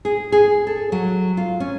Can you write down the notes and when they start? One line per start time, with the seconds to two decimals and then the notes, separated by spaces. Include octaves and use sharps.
0.05 G#4
0.32 G#4
0.67 A4
0.92 F#3
1.37 F4
1.60 C#4